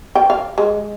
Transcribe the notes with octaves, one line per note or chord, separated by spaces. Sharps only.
G5
F5
G#3